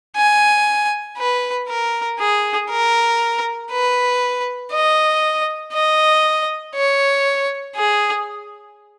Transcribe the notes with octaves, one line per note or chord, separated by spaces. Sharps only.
G#5
B4
A#4
G#4
A#4
B4
D#5
D#5
C#5
G#4